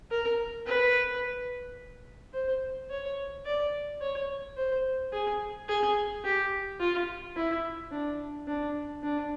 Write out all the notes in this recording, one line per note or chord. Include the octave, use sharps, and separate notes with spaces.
A#4
B4
C5
C#5
D5
C#5
C5
G#4
G#4
G4
F4
E4
D4
D4
D4